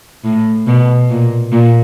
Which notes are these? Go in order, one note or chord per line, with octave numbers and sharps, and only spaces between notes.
A2
B2
A#2
A#2